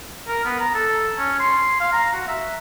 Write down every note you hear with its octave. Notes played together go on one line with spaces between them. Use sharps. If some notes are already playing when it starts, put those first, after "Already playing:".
A#4
B3
A#5
A4
C#4
C6
F5
A#5
F#4
E5